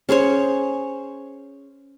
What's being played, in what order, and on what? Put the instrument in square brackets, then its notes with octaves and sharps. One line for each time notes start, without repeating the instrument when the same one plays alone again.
[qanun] C#4 G#4 C5 C#5